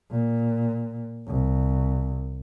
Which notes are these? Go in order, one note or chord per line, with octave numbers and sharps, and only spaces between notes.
A#2
C2